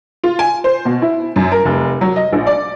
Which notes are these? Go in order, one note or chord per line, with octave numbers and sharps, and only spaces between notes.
F4
G#5
C5
B2
E4
F#2
A#4
F1
F#3
D#5
A#1
D5